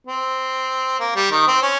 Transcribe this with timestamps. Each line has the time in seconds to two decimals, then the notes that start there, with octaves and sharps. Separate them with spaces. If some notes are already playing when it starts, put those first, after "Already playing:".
0.07 C4
0.99 A#3
1.15 G3
1.31 D#3
1.47 C4
1.62 C#4